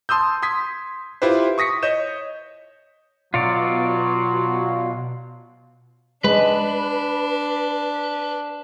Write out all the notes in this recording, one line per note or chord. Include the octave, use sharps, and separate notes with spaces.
A5 C6 D#6 E6 G6
C6 D#6 G#6 B6
E4 F4 G4 B4 C5
C#6 D#6 A#6 B6 C#7
C#5 D#5 G6 E7
B2 F#3 F4 C#5 D5
G#3 D4 B4